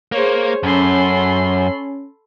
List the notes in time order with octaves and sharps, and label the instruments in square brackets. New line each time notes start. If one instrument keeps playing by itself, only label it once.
[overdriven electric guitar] A#3 [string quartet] G#4 C5 C#5
[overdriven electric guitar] F#2 [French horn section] C#4 [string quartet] A4 B5 C6